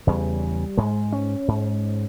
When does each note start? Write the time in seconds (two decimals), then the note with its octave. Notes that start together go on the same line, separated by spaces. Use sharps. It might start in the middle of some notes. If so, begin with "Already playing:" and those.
0.07 E2 C#3 G3
0.77 G#2 G#3
1.12 C#4
1.48 G#2